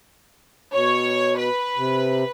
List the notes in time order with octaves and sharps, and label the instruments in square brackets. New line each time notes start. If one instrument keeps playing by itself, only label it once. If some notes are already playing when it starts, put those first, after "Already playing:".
[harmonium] B2 [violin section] C#5
[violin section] B4
[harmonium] C3